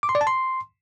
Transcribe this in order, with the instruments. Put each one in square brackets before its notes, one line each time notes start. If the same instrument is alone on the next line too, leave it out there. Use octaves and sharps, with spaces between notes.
[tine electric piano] D6
C6
D5
A5
C6